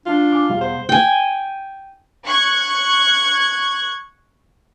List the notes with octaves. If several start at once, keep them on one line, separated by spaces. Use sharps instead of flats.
D4 F4
G#5 D6
E2 B2 G3 F5
C5
G5 G#5
C#6 F#6 G#6